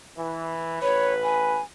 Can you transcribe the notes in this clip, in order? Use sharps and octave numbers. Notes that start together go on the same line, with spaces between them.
E3
A1 B4 C#5
G#5